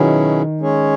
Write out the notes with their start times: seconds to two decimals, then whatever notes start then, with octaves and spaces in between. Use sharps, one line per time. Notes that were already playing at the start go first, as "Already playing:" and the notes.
Already playing: B2 D#3 F#3 C#4 E4 G#4
0.60 G#3 C#4 G#4 C#5